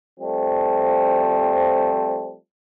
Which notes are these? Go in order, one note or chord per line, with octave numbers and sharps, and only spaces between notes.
F3 G3 A3 C4